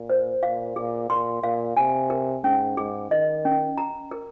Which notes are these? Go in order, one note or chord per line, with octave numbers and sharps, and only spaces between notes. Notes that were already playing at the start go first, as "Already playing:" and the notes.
Already playing: A#2
C5
A#2 F5
A#2 G#4
A#2 C6
A#2 F5
C3 G#5
A#4
G#2 C#4
G#2 G#4
D#3 D#5
C#4
A#5
A#4